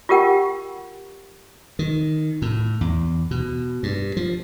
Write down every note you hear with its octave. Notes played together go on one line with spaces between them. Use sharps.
F4 G4 A#4 F#5 G5
D#3
A2
E2
B2
G2
F3